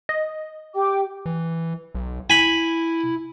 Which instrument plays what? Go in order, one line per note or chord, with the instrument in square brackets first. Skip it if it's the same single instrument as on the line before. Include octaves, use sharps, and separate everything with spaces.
[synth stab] D#5
[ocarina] G4 [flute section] G5 D6
[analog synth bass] E3
B1
[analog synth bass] E4 [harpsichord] G#5 B5